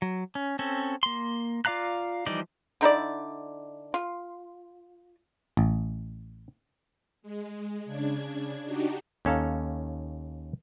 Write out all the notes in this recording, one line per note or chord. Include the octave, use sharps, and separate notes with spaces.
F#3
C#4
C4 C#4 A4
A#3 C6
F4 D5 F5 A#5 F#6
E3 F3 G3 D#4 D5
D3 D#4 E4 D5
F4
A1
G#3
C#3 D4 G#6
D4 D#4 F#4 G4
D#2 C#4 A4 F5 A#5